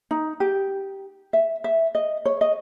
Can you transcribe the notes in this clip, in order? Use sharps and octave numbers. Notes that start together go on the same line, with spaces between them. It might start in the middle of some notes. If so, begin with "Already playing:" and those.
D#4
G4
E5
E5
D#5
C#5
D#5